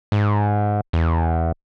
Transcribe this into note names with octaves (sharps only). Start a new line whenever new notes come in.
G#2
E2